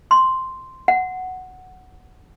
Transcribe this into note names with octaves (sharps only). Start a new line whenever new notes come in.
C6
F#5